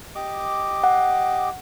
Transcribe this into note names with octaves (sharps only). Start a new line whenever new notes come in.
G4 D#5 D6
F#5